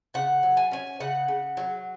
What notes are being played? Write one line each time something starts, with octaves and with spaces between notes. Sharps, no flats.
C#3 F#5
F#3
G#5
C#4 G#5
C#3 F#5
C#3
F#3